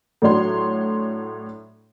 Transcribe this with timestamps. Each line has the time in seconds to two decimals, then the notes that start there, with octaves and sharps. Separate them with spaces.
0.22 A2 F#3 D4 C#5 C6